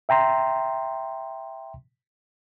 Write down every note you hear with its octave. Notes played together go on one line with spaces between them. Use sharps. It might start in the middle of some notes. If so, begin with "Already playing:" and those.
E5 G5 A#5 C6